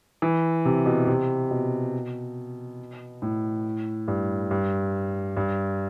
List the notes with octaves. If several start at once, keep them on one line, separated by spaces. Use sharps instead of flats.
E3
C3
B2
C3
B2
A2
G2
G2
G2